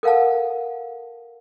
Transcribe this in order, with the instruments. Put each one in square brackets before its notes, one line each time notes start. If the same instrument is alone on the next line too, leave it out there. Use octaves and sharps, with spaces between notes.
[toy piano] A4 A#4 F5 F#5 A5